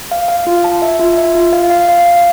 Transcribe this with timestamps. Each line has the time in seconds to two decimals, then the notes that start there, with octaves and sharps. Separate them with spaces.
0.11 F5
0.28 F5
0.47 F4
0.64 A5
0.82 E5
1.00 F4
1.17 E5
1.35 F4
1.53 F5
1.70 F5
1.89 F5
2.06 F5